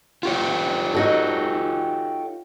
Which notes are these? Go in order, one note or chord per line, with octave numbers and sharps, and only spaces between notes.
F4 G4 C#5
D#4 F#4 A4